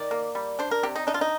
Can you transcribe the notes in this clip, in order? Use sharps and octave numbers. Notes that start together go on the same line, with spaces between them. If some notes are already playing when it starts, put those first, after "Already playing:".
Already playing: D#3 D5
A#3
G3
D4 C5
A#4
C3 G4
D#4
D4 D#4
F4
D#4